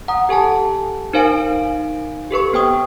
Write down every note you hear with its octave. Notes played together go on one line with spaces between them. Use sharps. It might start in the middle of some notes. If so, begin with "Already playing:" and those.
F#5 A#5 D#6
G4 A4 G#5 A5
D#4 A#4 C5 F5 G#5 D7
G4 A4 B4 C#6
B3 C5 G5 D#6